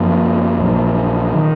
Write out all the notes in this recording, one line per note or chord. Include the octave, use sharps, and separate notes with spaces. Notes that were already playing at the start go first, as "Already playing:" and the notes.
Already playing: F#2 F3 A#3
A#1 A#2 F#3
D#3